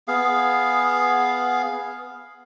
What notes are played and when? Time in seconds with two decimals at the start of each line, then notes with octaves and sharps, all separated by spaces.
0.08 B3 G#4 F5